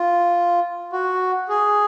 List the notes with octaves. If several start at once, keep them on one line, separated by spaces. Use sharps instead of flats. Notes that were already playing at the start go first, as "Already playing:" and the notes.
Already playing: F4
F#4
G#4